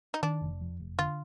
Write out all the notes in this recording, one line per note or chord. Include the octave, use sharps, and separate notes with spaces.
D#4
D#3 D4
F1
F2
F1
D3 F4